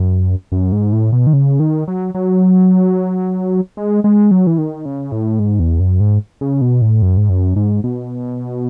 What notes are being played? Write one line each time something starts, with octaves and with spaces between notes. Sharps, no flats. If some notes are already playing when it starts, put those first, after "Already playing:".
Already playing: F#2
F#2
G#2
A2
B2
D#3
C#3
D#3
F#3
F#3
G#3
G#3
F#3
E3
D#3
C#3
A2
G#2
E2
F#2
G#2
C#3
B2
A2
F#2
G#2
F#2
G#2
B2